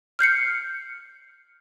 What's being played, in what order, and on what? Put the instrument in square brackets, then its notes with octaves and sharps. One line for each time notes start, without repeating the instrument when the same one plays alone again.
[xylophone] F6 G6 C7 C#7